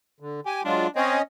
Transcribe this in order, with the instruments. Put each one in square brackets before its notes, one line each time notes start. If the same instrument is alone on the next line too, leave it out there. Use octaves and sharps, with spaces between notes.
[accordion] D3
[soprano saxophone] G4 [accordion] G#5
[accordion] F#3 G#3 F4 [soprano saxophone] D4
[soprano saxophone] C4 [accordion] C#4 C#5 D#5